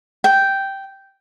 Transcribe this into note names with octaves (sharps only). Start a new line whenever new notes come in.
G5